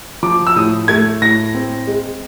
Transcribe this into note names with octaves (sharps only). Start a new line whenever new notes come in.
F3 D6
E6
A2 D#6
A3 G#6
A2 A#6
C4
G#3